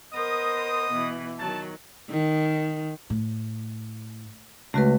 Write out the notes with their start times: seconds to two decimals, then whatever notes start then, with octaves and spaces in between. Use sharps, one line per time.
0.14 B3 A#4 C5 D#5 D#6
0.92 B2 E3
1.39 D#3 F#3 A5
2.10 D#3
3.10 A2
4.74 C#2 A3 F#4 B4